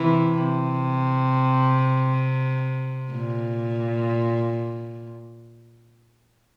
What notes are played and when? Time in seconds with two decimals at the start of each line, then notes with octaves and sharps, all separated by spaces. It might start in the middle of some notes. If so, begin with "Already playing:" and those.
Already playing: C3 E3
0.32 C3
3.12 A#2